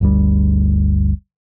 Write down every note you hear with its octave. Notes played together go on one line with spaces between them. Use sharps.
G1 D2 G3